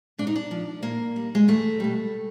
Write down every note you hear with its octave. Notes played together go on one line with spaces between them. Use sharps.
G#2 D4
D#4
D4
F3
A#2 A#3
G3
G#3
E2 A3
B2 G3